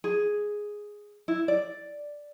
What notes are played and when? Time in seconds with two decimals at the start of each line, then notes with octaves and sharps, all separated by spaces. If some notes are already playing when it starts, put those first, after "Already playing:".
0.04 G#4
1.28 E4
1.48 D5